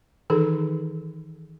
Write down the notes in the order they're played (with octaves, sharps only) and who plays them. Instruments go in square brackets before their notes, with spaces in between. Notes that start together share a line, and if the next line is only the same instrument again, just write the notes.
[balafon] D#3 E3 D#4 G#4 A4